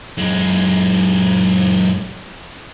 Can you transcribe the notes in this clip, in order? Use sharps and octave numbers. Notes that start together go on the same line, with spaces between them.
F#2 G#3